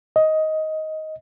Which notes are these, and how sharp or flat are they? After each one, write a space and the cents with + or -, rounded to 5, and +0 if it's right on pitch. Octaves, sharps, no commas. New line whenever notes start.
D#5 +10